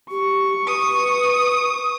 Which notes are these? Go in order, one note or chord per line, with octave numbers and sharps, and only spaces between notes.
G4 C#6
B4 D#6